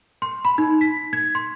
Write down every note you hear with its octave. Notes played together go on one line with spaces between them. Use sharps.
C6
B5
D#4
B6
G#6
C6